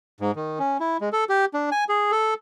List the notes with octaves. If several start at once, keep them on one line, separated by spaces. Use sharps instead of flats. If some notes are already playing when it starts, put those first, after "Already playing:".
G#2
D#3
C#4
E4
G#3
A4
G4
D4
G#5
G#4
A4